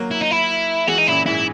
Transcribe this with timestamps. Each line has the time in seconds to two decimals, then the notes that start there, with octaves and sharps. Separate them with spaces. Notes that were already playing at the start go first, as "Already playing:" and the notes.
Already playing: F#3 A#3
0.11 E4
0.21 D#4
0.31 E4
0.88 E3 G#3 F#4
0.98 D#4
1.08 F#2 A#2 E4
1.26 G#2 E4